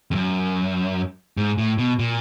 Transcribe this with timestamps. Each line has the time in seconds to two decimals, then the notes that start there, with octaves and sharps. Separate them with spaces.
0.11 F2
0.15 F#2
1.37 G#2
1.58 A2
1.78 B2
1.99 A#2